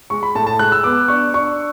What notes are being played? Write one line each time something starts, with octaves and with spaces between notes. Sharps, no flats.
G#3 C#6
B5
A2 A5
A5
G#3 F#6
E6
B3 D6
D4 C#6
D4 C#6